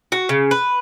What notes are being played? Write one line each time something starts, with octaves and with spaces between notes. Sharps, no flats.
F#4
C#3
B4